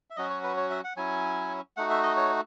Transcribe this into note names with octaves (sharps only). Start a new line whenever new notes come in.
E5
F#3 C#4 F#4 D#5
C#5
B4
C#5
E5
F#5
F#3 C#4 E4 G#5
A3 D#4 F#4 F#5
E5
D#5
C#5